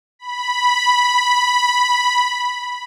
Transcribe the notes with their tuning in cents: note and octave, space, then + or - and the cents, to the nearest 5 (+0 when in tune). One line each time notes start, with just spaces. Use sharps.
B5 -5